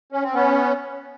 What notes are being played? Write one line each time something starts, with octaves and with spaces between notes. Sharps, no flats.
C#4
C4
B3 C#4